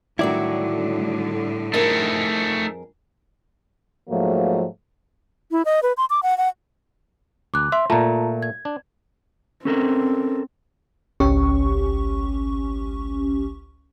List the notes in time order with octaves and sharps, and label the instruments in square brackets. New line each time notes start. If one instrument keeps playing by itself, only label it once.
[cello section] A2 D3 G3 [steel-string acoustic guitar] D#3 F#3 F#4 [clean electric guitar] E4 D5
[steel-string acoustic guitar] F2 G#4 A#4 [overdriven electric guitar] A3 D#4
[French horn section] G#2 F3 F#3 A3 A#3
[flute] E4
D#5
B4
C6
D6
F#5
F#5
[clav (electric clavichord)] D2 [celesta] D6 F#6
[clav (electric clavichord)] E5 [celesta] C6
[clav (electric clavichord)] A#2 A3 [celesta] F4 A5 A#5
[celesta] G#6
[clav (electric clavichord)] D4
[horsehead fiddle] C4 [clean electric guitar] C#4 A4 A#4
[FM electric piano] G#1 C#2 C#4 G4 C#6